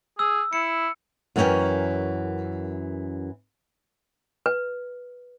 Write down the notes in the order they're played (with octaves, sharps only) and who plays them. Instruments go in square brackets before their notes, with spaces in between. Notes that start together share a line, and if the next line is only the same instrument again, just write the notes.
[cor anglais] G#4 [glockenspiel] E6
[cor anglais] E4 [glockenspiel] C#7
[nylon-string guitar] F#2 E3 A#3 C#4 A#4 G5
[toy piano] B4